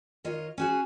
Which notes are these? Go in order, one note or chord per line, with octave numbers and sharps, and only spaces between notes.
D#3 F4 C#5 D#5
C#4 F#4 G#4